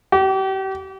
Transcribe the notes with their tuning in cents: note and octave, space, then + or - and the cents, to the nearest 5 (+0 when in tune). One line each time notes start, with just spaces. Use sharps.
G4 -35